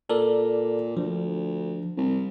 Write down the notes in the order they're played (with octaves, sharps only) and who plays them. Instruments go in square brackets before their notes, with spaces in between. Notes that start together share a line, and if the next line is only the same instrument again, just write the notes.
[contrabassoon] A#2 [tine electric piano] A4 A#4 D5
[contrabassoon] D2 [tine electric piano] F3
[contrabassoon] C2